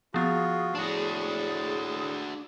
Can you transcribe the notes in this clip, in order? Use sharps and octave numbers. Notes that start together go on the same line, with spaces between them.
F3 B3 F4 F#4 G#4
A2 D4 F#4